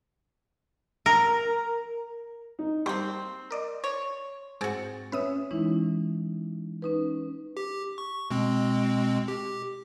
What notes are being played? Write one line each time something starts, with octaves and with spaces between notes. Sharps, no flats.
A#4
D#4
G3 A#3 C4 C6 G6
A#4 D5 D#5
C#5 D5
G#2 C4 F#4 G#4 A6
C#4 B4 E5 D#6
E3 G#3 C#4 D#4 E4
C#4 D#4 B4
G4
C#6
B2 G#3 C4
G4